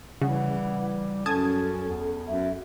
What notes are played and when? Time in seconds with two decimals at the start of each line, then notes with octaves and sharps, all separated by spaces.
0.22 C#3 E3 G3 F#5
1.26 F#2 C#4 A4 A5 D#6 G#6
1.89 E2
2.28 F#2 E5